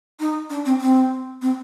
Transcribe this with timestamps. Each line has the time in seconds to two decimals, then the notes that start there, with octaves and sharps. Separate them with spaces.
0.20 D#4
0.50 D4
0.65 C4
0.81 C4
1.42 C4